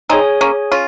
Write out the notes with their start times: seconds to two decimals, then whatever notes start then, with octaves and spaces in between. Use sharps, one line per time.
0.09 C4 D#4 G#4 C#5 G#5
0.41 A#3 C#4
0.72 C#4 F4